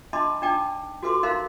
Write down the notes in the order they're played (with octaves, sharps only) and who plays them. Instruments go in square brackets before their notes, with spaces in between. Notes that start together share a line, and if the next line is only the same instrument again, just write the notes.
[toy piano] D4 D#5 A5 B5 C6 D6
D4 D#4 D5 G5 A5 D6
F#4 A4 B4 C6 D6
D#4 A#4 C5 F5 A#5 C6